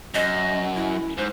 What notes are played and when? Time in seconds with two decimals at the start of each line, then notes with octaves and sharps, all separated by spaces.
0.14 F#2 D#5
0.76 E4
1.18 G#2 C5